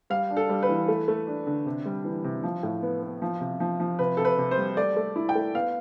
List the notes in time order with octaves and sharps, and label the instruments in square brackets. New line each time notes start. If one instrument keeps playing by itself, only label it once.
[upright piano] G3 F5
D4
A4
G3
B4
E3
A3
A3
D4
D3
C3
G3
E3
C3
F3
A2
B3
B3
F3
C3
F3
F3
C3 B4
C3 A4
B4
C3
C5
G3
A3 D5
A3
E4
G5
A3
B3 F5